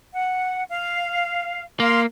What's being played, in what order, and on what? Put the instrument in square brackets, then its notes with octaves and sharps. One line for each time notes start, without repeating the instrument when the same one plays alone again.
[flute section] F#5
F5
[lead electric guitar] A#3 [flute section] F5 C6